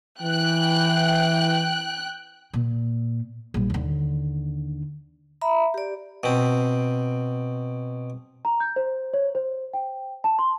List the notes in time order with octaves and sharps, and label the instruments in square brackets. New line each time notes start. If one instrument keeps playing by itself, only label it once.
[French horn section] E3 [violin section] G5 F#6
[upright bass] A#2
A#1 G3
D#2 D3
[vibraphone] E5 A#5 B5
G4 D5
[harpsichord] B2 C4
[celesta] A#5
G6
C5
C#5
C5
G5
A5
C6